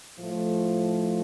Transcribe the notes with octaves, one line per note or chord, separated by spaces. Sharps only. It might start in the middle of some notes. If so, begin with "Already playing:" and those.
A2 F3 A3